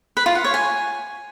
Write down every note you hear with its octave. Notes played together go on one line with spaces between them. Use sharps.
B4
F4
F#5
C#5
G#5